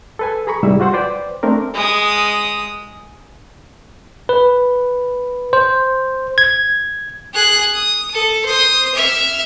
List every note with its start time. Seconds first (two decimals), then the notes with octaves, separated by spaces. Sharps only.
0.19 A4 B4 G#5
0.47 G#4 A#5 B5 C#6
0.63 C2 G#2 G3 E4 G#4 E6
0.80 F4 F#4 C5 F#5 C6
0.93 B4 C5 D5 G5
1.43 A3 C4 D4 A#4
1.74 G#3 D#6
4.29 B4
5.53 C5
6.38 G#6
7.34 G#4 F#6
7.74 D#6
8.13 A4
8.45 C5 D#6
8.95 E5 F6